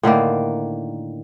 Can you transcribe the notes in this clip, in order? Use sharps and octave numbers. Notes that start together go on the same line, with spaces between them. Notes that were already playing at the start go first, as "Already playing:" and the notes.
A2 D3 D#3 A#3